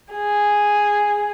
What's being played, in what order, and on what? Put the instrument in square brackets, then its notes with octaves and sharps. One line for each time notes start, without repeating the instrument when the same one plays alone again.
[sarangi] G#4